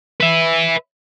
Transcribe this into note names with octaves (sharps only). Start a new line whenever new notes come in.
B4 E5